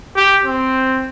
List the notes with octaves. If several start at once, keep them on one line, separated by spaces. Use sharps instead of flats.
G4
C4